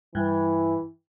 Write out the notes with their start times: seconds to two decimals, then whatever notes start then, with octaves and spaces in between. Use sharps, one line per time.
0.15 G2 E3